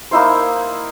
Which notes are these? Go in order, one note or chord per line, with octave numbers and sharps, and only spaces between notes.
A#3 D#4 E4 C5